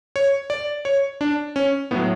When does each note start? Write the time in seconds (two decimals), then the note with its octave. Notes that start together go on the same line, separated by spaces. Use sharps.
0.16 C#5
0.50 D5
0.85 C#5
1.21 D4
1.56 C#4
1.91 A2 F#3 B3